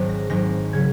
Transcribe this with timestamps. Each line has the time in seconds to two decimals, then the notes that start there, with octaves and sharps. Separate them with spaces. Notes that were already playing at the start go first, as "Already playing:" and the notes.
Already playing: G#1 G#2 F#3
0.09 A#6
0.29 G#1 G#2 F#3 A#6
0.73 C#3 F#3 G#6